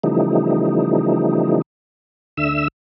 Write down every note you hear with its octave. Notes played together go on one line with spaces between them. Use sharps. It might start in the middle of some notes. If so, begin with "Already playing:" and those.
C#3 E3 F3 G3 A3 D#4
D2 D3 E5 E6